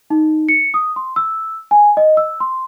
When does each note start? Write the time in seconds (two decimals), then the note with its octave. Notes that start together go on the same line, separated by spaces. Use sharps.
0.10 D#4
0.49 C#7
0.74 D#6
0.96 C6
1.16 E6
1.71 G#5
1.97 D#5
2.17 E6
2.40 C6